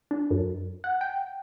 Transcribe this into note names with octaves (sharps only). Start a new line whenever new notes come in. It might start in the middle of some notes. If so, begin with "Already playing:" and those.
D4
F#2
F#5
G5